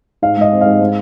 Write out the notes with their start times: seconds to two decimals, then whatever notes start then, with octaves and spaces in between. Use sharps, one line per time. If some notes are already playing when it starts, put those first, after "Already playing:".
0.22 G#2 F5
0.37 G#3 D#5
0.52 C4
0.61 G#2 F5
0.80 G#3